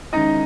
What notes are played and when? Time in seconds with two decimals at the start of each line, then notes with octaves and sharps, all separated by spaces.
0.13 D#3 G#3 C#4 D#4 E4 D#5